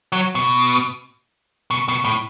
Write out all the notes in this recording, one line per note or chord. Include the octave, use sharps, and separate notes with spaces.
F#3
B2
B2
B2
A2